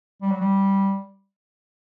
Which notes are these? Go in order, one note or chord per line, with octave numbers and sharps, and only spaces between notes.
G3
F#3
G3